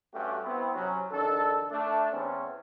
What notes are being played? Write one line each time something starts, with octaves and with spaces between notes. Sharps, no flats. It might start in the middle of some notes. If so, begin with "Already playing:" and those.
G2 G3 A3 C#4 F#4 G4
B3 C4 E4
C3 F#3 C#4
A#1 D#3 D4 A4
A3 D4
E2 C4 C#4